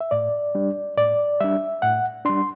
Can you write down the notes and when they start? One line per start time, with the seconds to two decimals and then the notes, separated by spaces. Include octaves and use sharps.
0.01 E5
0.11 A2 D5
0.55 G3 D4
0.97 A2 D5
1.40 G3 D4 E5
1.82 A2 F#5
2.25 G3 D4 C6